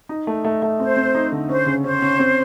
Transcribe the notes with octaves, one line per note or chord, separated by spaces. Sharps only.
D#4
A3
A3
A3
C4 C5
C4
D#4
D3
C#4 C5
C#3
C#4 C5
C#4
C4